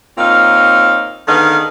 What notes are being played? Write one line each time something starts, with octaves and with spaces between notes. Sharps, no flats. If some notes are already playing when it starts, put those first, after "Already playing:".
A#2 C4 D#4 C#5 F5
D3 D#3 B3 G#4 D#5 F5